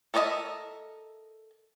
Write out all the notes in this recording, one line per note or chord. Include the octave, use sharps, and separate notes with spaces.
A4 A#4 C#5 D#5 E5